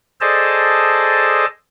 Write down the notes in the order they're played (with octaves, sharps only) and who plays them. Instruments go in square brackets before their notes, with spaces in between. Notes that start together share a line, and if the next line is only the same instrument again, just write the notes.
[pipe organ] G#4 A4 C5 D5 D#5 A5